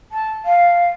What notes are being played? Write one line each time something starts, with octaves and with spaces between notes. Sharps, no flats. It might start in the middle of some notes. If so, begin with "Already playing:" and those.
A5
F5